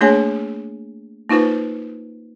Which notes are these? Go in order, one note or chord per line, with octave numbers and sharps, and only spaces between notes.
A3 A#3 D4 G#4 C#5 G#5
A#3 D#4 F4 B4 C5